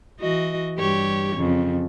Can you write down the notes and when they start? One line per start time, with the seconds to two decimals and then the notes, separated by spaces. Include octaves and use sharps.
0.20 E3 F#4 D#5
0.78 G2 G4 C#5
1.36 F2 C#3